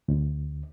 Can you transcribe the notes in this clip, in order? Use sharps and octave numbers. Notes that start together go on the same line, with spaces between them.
D2